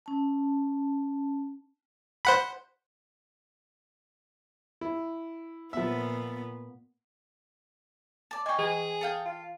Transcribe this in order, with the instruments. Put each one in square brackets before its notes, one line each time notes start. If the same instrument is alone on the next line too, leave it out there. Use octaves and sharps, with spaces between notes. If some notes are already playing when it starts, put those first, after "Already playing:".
[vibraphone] C#4 A5
[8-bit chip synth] C5 F#5 B5
[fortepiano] E4
[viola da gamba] A#2 B3 [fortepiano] F3 E5
[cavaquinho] D5 A5
[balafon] D#5 C#6 [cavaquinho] G5 G#5
[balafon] E3 [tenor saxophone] G#4
[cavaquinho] A4 F5 G5
[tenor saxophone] F4